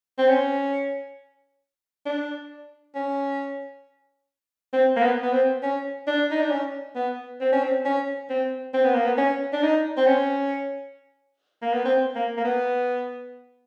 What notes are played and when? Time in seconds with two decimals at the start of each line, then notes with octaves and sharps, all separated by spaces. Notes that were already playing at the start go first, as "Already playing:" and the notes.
0.18 C4
0.29 C#4
2.06 D4
2.95 C#4
4.73 C4
4.96 A#3
5.03 B3
5.22 B3
5.32 C4
5.63 C#4
6.07 D4
6.31 D#4
6.41 D4
6.51 C#4
6.95 B3
7.41 C4
7.53 C#4
7.64 C4
7.85 C#4
8.30 C4
8.74 C4
8.85 B3
8.95 A#3
9.05 B3
9.18 C#4
9.53 D4
9.63 D#4
9.97 C4
10.07 C#4
11.62 A#3
11.74 B3
11.85 C4
12.15 A#3
12.37 A#3
12.44 B3